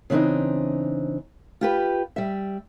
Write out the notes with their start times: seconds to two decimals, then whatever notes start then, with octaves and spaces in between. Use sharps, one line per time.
0.10 C#3 E3 C4 D4 D#4
1.61 F4 G4 B4
2.16 G3 E5